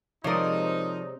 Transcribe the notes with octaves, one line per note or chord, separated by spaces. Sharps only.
C3 F3 G#3 D#4 A#4 C#5 D5 D#6